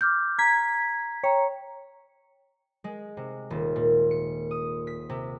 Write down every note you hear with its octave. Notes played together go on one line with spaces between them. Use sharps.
D6 F6 G6
A#5 G#6 B6
C#5 G5 A#5
G#3
C3
D#1
A#2
C#7
D#6
B6
C3